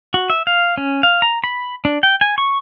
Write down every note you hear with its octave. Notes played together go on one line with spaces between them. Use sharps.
F#4
E5
F5
C#4
F5
A#5
B5
D4
G5
G#5
C#6